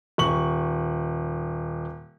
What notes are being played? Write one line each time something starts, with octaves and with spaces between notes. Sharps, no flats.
D#1 C#6 F#7